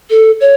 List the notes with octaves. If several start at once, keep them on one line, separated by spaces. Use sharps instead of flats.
A4
C#5